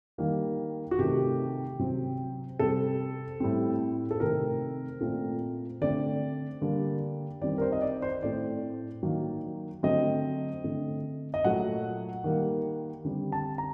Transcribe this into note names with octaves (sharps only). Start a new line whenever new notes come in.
D#3 G3 A#3
F#4
C3 D#3 A3 G4
C3 F#3 C4
C3 G3 C4 A4
A2 G3 C4
A4
C3 D#3 A3 C4 A#4
A#2 A3 C4
D3 A3 C4 D5
D3 G3 A#3
D#3 G3 C4 D5
A#4
C5
D#5
D5
C5
A2 A3 C4 D5
D#3 F#3 A#3
D3 F#3 A3 C4 D#5
D3 A3 C4
D#5
A#2 F#3 A3 F#5
D#3 G3 A#3
D3 G3 C4
A5
A#5